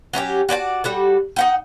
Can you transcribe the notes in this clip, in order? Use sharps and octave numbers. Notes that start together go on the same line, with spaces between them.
F#3 C#4 E4 G4
F#4 D5 G5 A5
G3 F#4 A4
D#4 F#5 G5